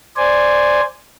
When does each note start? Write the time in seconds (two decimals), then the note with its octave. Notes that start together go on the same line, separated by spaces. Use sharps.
0.17 C5 D5 G#5